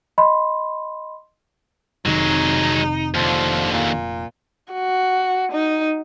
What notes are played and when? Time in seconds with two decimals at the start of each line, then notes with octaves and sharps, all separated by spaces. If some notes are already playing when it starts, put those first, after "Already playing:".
0.18 D#5 B5 C6
2.06 F1 C3 D#3 F#3 G#3 D#4
3.14 D#2 D3 F3
3.73 A#2
4.73 F#4
5.52 D#4